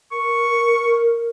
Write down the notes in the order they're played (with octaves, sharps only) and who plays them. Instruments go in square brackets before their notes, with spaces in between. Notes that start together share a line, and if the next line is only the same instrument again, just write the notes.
[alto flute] A#4 [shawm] C#6